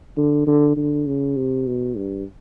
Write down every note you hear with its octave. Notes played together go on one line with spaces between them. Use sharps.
D3
D3
D3
C#3
C3
B2
G2